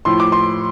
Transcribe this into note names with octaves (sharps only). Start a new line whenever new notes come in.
A2 F3 C6
D6
C6